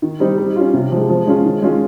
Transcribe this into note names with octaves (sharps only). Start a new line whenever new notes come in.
D#3
G3 C4 D#4
G3
C#4 F4
C3
F3 G#3
F3
G#3 C#4 F4
D#3
G#3 C#4 F4